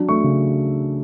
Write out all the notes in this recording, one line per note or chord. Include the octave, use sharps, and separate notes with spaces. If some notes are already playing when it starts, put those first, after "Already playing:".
Already playing: F#3 D4
A3 C#6
C#3